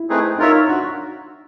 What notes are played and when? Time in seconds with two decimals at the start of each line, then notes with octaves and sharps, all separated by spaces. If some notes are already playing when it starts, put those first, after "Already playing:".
Already playing: E4
0.09 A3 C4 D#4 G#4 B4
0.39 D#4 F4 A#4 C#5 E5
0.68 D4 F#4